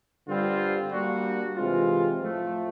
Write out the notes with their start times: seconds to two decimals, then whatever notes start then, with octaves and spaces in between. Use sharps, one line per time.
0.27 G2 D3 G3 C4 F4
0.92 G3 A#3 D4 F#4
1.55 C3 E3 G#3 C4 F4
2.21 A2 F3 A3